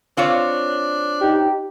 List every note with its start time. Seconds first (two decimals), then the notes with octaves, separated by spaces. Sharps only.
0.17 C4 D4 F4 C#5
1.21 D#4 G4